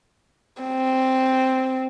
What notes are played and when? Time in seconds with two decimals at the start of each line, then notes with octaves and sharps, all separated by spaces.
0.62 C4